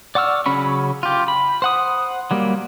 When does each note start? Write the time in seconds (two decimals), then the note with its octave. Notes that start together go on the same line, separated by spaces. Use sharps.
0.15 D5 F#5 C#6 E6 F6
0.46 C#3 F#3 C#4 B5 C#6
1.03 F4 G4
1.28 B5
1.62 C5 F#5 D#6
2.31 F#3 G3 A#3